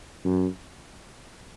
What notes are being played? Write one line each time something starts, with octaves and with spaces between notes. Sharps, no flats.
F#2